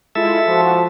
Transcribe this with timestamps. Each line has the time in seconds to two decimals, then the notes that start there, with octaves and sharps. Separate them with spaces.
0.15 G#3 E4 F4 A4 E5
0.48 F3 F#4